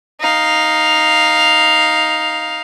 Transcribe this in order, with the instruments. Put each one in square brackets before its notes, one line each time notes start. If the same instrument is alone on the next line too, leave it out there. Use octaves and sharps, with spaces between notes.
[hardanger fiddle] D#4 F5